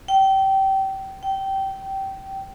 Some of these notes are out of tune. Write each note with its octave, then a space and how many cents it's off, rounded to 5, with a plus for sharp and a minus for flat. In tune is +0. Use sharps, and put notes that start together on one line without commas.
G5 -25
G5 -20